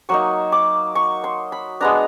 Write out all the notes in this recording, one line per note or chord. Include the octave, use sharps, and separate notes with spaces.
F#3 A#3 D#4 C#6
D6
C#6
C6
B5
G#3 B3 D4 A#5